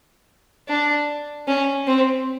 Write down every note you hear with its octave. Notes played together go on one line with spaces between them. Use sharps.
D4
C#4
C4